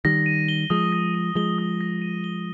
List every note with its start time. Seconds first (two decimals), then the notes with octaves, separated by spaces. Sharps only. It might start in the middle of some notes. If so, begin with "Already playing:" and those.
0.05 D#3 G3 A#6
0.26 D#7
0.48 G7
0.70 F3 G#3 D#6
0.92 A#6
1.15 D#7
1.35 F3 G#3 G7
1.58 D#6
1.81 A#6
2.02 D#7
2.24 G7